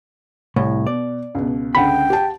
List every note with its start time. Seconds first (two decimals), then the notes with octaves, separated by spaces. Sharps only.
0.56 C2 A2
0.87 B2 D5
1.35 C#2 B2
1.75 C#2 D3 F#5 G5 B5
2.10 G4 A5